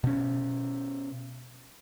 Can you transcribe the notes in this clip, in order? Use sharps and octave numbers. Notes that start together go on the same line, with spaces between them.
B2 C#4